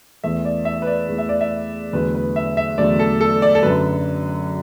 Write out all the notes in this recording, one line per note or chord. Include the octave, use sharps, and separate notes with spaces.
E2 E3 A3 E5
D5
E5
B4
D5
E2 E3 A3
E5
D5
E5
E2 D3 F#3 A3 B4
B4
E5
E5
E2 D3 F#3 A3 D5
A4
A4
D5
A4
F#2 D3 F#3 B4